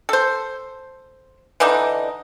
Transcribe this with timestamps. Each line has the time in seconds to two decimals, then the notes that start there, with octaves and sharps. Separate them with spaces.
0.09 A4 C5
1.60 D3 E3 D4 D#4